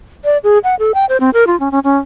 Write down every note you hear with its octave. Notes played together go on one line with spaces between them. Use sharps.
D5
G#4
F#5
A4
G5
C5
C4
A#4
F4
C#4
C#4
C#4